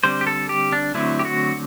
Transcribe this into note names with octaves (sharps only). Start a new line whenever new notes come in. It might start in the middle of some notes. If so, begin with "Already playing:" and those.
D3 G3 C4 C5
G4
A4
G4
D4
D3 F#3 A3 C4 E4
G4
F#4